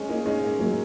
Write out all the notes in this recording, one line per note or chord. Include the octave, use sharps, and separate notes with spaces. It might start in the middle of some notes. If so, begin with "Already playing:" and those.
Already playing: G#3 C#4
A#3 D#4
G#3 C#4
G#3
F#3 A#3